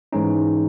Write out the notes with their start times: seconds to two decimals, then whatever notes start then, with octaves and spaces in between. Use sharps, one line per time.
0.13 G#2 E3 G#3 C#4 D#4